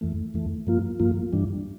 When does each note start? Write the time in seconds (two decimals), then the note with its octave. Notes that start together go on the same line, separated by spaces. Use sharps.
0.01 F2 E3 A3
0.34 F2 E3 A3
0.67 G2 F3 A#3 F4
1.00 G2 F3 A#3 F4
1.33 G2 E3 G3 D4